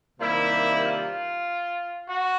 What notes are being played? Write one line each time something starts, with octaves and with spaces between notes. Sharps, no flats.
C3 D#3 G3 A#3 E4
F4
F#4